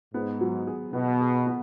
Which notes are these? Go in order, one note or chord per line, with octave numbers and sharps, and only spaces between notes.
G#2 B3
F#3
G#4
B2 B3
G#4
B3